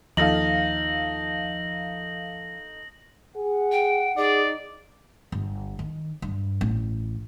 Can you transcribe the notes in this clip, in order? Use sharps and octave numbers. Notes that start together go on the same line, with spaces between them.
D#2 F3 D#4 A4 F5 A#6 F#7
G#4 F#5
G5
D#4 G#4 D5
G1
D#3
G2
A1